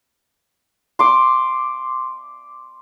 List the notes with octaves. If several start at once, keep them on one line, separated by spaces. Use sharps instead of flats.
C6 D6